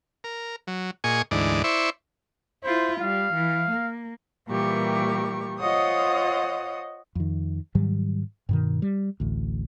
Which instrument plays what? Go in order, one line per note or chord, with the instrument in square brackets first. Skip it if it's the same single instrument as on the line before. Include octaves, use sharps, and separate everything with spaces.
[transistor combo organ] A#4
F#3
A#2 G#4 D#5 G#5 C#6
D2 G#2 E3 D#4 D5
E4 C5 D5 E5 C#6
[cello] E4 F4 [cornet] C5
[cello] G3 [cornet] F5
[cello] E3
A#3
[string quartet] A#2 E3 G3 G4 A#4 C#6
F4 C5 C#5 D#5 F#5 D#6
[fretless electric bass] F2 D#3
G#2 D#3 F#3 G3
G2 B2 D#3
G3
A1 D2